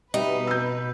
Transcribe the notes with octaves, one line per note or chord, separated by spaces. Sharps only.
B2 G3 D#4 B4 E5
E6 G6